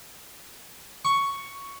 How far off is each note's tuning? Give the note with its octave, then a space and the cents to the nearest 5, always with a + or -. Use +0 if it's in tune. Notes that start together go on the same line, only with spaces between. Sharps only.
C#6 +5